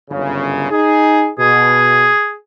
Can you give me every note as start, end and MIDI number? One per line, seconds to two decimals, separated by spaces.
0.10 0.68 31
0.10 0.68 42
0.10 0.68 49
0.71 1.31 63
0.71 1.31 68
1.39 2.11 47
1.39 2.34 68